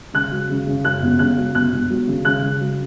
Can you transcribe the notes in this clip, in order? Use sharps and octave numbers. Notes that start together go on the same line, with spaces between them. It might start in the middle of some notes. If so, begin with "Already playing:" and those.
C#3 F#6
F#3
C#3
C#3
F#2 F#6
G1
C#3 F#6
F#3
G1 F#6
G1
F#3
C#3
C#3 F#6
C#3
F#3